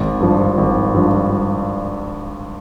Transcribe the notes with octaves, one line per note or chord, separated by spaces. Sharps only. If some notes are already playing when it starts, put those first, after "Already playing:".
Already playing: G#1
G2 F3
G#1
G2 F3